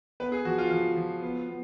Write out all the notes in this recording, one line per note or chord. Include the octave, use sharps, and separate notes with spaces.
B3 B4
G#4
F3 F#4
F4
F3 F4
F3
B3
B3